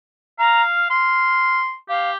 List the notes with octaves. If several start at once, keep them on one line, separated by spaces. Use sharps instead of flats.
F5 A#5
F6
C6
G4 F5